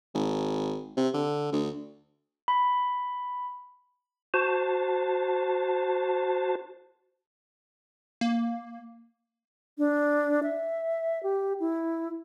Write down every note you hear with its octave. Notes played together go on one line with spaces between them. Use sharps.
G#1
C3
D3
D2
B5
F#4 C5 A5
A#3
D4
E5
G4
E4